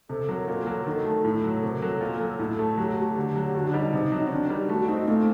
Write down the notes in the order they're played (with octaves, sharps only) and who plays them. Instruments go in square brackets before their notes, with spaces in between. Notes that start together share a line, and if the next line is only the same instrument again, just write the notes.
[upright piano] C3 [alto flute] A4
[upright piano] F#3 [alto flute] A#4
[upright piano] A#2 [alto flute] A4
[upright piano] F#3 [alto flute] A4
[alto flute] A#4
[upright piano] D#3 [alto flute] A4
[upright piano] A3
A2
F#3
[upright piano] C3 [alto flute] A#4
[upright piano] F#3 [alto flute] A4
[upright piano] A#2
F#3
A2
A3
[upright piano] F#3 [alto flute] G4
[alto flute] F#4
[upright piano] A3 [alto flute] G4
[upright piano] D3
F#3
[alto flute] G4
[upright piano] D3 [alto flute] F#4
[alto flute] D4
[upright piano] G3 [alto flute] D#4
[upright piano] C3
F#3
[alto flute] C4
[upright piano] D#3 [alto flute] D4
[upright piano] G3
[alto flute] G4
[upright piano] A3 [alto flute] F#4
[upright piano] C4 [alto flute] D#4
[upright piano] A#2 [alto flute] A3